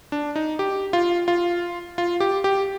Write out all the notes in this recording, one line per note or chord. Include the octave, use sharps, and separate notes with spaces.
D4
D#4
G4
F4
F4
F4
G4
G4